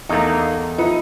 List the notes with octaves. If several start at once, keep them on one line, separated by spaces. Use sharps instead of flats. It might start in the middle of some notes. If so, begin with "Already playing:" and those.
E2 A3 A#3 D#4
F3 D#4 B4 E5